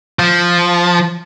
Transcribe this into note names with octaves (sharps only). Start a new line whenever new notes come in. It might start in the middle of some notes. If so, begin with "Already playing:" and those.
F3